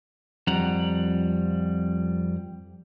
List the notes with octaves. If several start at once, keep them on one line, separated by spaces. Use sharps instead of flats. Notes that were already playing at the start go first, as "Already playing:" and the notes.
F2 G3 F#5 A#5